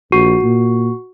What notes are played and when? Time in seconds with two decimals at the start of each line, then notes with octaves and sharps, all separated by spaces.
0.12 A#1 F#4
0.43 A#2